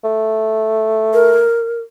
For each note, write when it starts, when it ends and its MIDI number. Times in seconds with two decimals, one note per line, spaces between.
0.04 1.45 57
1.14 1.80 70